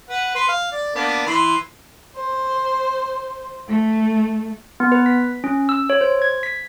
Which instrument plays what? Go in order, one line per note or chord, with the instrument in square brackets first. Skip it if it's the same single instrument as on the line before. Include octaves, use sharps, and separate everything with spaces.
[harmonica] B4 F#5
B4 C6
F5
D5
A#3 B3 D4
E3 B5 C6
[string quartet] C5
A3
[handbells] B3
B4
B6
C#4
E6
C#5
C5
G#6
B6